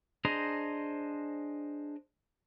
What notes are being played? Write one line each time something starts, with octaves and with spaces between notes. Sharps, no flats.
D4 G#4 C5 D#5 A#5